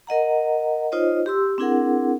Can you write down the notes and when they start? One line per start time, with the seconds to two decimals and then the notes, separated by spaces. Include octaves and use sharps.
0.07 A#4 D#5 F#5 A#5
0.92 D#4 F4 C5 C#5 D#5
1.26 G4 C6 E6
1.58 C4 D4 E4 G#4 A#4 F#5